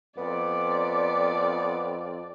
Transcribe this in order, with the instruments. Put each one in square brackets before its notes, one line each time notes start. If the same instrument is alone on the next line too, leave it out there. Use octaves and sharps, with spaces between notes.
[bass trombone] F2 [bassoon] B3 [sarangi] D5